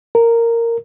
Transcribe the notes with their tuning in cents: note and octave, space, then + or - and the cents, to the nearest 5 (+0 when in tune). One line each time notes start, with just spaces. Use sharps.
A#4 -10